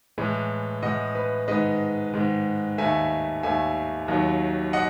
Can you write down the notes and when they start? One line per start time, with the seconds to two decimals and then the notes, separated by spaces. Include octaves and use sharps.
0.18 A2 E3 G#3
0.82 A2 E3 G#3 D#5 F#5
1.15 B4
1.48 G#2 D#3 G#3 B4 D#5
2.14 G#2 D#3 G#3
2.78 D#2 D#3 A3 E5 G#5
3.43 D#2 D#3 A3 E5 G#5
4.08 D#2 D#3 F#3
4.73 D#5 F#5